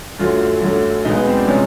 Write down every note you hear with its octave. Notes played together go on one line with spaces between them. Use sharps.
F#2 D3 F#3 A3 F4
F#2 D3 F#3 A3
B1 B2 G#3 D#4
B3
C4
D4
C3 F3 G#3 C#4